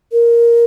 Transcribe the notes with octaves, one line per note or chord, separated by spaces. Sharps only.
A#4